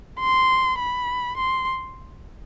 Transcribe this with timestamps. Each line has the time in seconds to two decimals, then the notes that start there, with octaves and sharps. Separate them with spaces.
0.20 C6
0.79 B5
1.37 C6